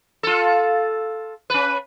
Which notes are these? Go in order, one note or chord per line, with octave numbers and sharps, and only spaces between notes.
F4 A4
C#4 B4